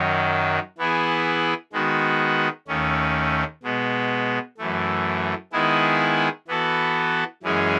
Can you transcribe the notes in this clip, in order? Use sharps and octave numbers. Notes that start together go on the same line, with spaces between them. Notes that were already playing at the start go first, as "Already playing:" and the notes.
Already playing: F#2 D#3 F#3
E3 B3 E4 G#4
D#3 G#3 B3 F#4
D#2 D#3 A3 C#4
B2 G#3 B3
F#2 E3 A3
D#3 G#3 B3 E4 G#4
E3 B3 F#4 A4
F#2 E3 G#3 C#4 G#4